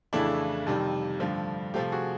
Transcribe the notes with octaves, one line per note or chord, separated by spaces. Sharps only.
F2 C#3 E3 A3 D4 E4
F2 C3 D#3 G3
G2 D3 F3 A3
C3 F3 A3 F4 G4
F#4 G#4